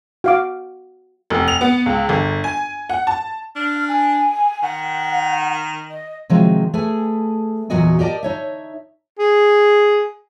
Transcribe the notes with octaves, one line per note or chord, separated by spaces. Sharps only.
F#4 F5 D6
F1
F7
B3
C#2
G1
G#5
F#5
A5
D4 F6
G#5
D#3 F#5
D#5
C3 D#3 F3 F#3 G#3
A3 G#4 B4 G#5
E2 A#2 F#3 F#4 D#5 G#5
G4 A#4 D5 D#5 A5
D#4 C#5 E5
G#4